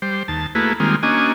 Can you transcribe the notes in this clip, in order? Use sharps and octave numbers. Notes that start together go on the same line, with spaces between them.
G3 C5
D#2 A5
A3 A#3 E4 F#4 G#4 B4
D#3 G3 G#3 A#3 C4 F4
A#3 C#4 D4 F#4 D#5 G#5